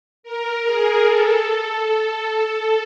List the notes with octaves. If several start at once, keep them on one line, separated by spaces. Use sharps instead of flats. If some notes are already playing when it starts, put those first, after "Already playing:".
A#4
G#4
A4
A4
A4